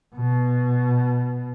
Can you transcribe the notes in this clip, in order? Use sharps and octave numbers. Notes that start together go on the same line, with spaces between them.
B2